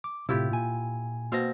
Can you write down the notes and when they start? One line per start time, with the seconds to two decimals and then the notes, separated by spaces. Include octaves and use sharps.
0.04 D6
0.29 A2 C3 E4 F4 G4
0.51 A#2 G#5
1.32 B2 A#3 C4 F5 A#6